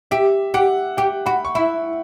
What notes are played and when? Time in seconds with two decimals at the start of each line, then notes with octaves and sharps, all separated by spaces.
0.11 G4 E5
0.54 G4 F#5
0.97 G4 G5
1.26 F#4 B5
1.45 C#6
1.55 E4 B5